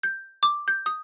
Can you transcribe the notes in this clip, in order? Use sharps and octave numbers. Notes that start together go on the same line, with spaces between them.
G6
D6
G6
D#6